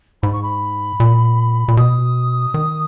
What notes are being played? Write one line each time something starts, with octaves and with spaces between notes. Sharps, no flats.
G#2 B5
C#6
B5
A#2
A#2
B2 D#6
D#3